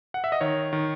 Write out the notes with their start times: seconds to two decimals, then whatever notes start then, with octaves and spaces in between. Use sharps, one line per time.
0.14 F#5
0.24 E5
0.32 D#5
0.41 D#3 C#5
0.73 D#3